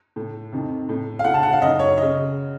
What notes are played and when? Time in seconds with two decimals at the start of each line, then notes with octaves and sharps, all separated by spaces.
0.16 A2
0.52 F2 C3 D#3
0.89 A2
1.19 F5
1.24 A2 F#5
1.34 A5
1.43 F#5
1.53 F5
1.62 F#2 D#3 D#5
1.79 C#5
1.98 D#5
2.02 C#3